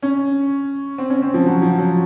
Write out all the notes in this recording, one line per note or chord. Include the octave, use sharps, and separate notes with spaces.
C#4
C4
C#4
C4
F3
F#3
F3
F#3